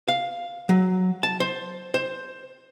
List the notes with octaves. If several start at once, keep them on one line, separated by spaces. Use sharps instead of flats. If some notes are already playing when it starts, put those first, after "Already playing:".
F5
F#3
A5
C5
C5